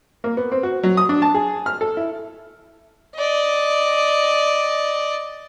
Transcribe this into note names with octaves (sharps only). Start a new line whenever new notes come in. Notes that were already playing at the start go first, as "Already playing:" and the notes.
A#3
B3
C4
F#4
F#3
D#6
D4
A5
G#4
F6
A4
E4
D5 D#5